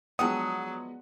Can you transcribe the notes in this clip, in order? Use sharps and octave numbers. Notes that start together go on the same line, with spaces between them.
D3 F3 F#3 G#3 B3 G4 F#5 D#6